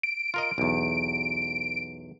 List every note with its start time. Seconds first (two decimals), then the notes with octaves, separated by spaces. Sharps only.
0.03 D7
0.34 F4 A#4 D#5
0.58 B1 E2